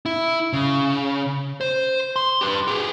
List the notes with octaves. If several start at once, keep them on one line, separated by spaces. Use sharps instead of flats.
E4
C#3
C5
C6
G4 B4
G4 G#4